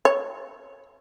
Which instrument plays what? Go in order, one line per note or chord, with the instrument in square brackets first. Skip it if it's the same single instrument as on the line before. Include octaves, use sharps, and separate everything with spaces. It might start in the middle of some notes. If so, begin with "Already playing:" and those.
[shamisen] C#5